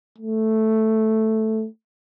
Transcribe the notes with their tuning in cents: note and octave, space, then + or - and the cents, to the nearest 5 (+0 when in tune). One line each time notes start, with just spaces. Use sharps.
A3 +0